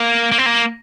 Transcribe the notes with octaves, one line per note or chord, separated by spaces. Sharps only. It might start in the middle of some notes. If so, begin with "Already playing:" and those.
Already playing: A#3
A#3
C4
A#3